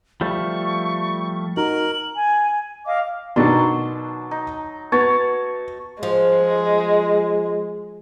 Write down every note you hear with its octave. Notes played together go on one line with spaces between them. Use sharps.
F3 G3 A3 C#6
D#4 F#4 A#4 F#7
G#5
D#5 F5 D6
B2 D#3 F#3 D4 A5 C6
D#4
B3 F#4 C#5 A5
F3 G#3